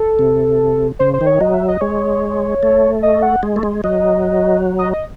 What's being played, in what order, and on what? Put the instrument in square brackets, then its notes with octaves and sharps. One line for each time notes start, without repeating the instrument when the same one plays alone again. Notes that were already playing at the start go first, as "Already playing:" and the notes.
Already playing: [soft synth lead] A4
[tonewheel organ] C3
[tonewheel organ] C#3 [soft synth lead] C5
[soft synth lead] C5
[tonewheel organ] D#3
[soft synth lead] C#5
[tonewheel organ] F#3 [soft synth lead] D#5
[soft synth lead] E5
D#5
[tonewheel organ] G#3 [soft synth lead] C#5
[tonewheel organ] A3
[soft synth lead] D#5
F#5
[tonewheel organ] G#3
A3
G#3
[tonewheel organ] F#3 [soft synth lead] D#5
[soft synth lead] D#5
D#5